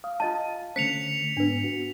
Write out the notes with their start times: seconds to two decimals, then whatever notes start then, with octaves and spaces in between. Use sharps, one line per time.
0.04 F5 D#6
0.20 F4 D#5 A5
0.76 D3 A3 C#4 C5 B6 C#7 F7
1.37 G#2 B3 D4 B4
1.64 F#4